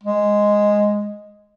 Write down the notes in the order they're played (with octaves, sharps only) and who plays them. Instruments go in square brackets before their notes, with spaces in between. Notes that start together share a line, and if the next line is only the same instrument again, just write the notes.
[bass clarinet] G#3